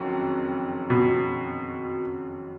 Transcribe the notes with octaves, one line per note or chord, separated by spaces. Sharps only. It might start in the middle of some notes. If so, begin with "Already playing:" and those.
Already playing: F#1 F2 D#3 F#3 C#4
B2